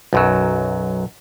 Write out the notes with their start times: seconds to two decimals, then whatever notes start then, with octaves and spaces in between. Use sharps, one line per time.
0.13 B1 F#2 F#3